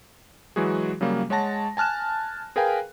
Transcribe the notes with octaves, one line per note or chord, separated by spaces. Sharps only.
E3 F#3 G#3 F#4 G#4
C#3 F#3 G3 A#3
G#3 C#5 F#5 A5 A#6
G#5 A5 F6 F#6 E7
G#4 A#4 B4 F5 G5 G#5